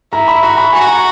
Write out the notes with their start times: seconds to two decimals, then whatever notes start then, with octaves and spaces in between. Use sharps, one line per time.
0.12 E4 A#5
0.28 B5
0.42 F#4 A#5
0.58 B5
0.73 F#4 G#5
0.87 A#5